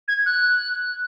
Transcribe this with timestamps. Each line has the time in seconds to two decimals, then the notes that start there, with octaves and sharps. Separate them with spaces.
0.08 G#6
0.26 F#6